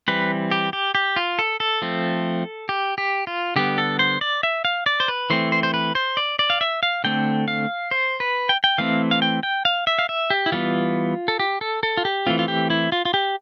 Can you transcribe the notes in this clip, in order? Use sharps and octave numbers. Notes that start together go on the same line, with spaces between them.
E3 G3 C4 B4
G4
G4
G4
F4
A4
A4
F3 A3 C4
G4
G4
F4
D3 G3 B3 G4
A4
C5
D5
E5
F5
D5
C5
B4
E3 A3 C4 C5
C5
C5
B4
C5
D5
D5
F5
E5
F5
D3 A3 C4 G5
F5
C5
B4
G5
G5
E3 A3 C4 F5
F5
G5
G5
F5
E5
F5
E5
G4
E4
E3 G3 B3 F4
A4
G4
A4
A4
F4
G4
E3 A3 C4 F4
F4
G4
E4
F4
F4
G4